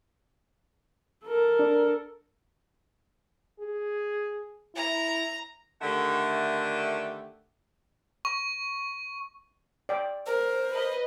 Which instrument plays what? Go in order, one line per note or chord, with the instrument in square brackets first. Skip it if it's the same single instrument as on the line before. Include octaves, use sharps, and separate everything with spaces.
[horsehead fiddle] A4 A#4
[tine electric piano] D4
[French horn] G#4
[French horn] E4 [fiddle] A#5
[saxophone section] D3 D#3 A3 G4 E5 F#5
[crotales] C#6
[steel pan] D5 G5
[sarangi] A#4 [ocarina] C5
[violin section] B4 D#5